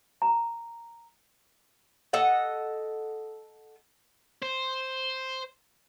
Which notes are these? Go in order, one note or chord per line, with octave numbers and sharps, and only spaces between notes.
A#5
A4 D#5 F#5
C5